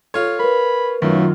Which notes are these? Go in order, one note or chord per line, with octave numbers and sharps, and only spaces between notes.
F4 A4 C#5
A#4 B4 B5
F#2 D#3 F#3 A3 F4